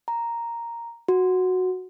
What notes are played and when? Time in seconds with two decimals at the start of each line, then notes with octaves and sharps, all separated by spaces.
0.08 A#5
1.08 F#4